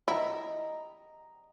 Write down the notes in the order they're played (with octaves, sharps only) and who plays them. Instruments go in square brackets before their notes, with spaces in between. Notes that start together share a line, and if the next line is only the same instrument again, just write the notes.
[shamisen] E4 [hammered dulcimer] D#5 A#5